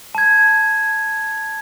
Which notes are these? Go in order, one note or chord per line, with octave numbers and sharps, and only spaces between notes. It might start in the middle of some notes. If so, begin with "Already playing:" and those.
A5 G#6